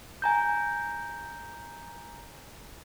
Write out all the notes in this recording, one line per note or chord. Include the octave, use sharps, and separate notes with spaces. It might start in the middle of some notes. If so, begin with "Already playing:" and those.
G#5 A#5 G6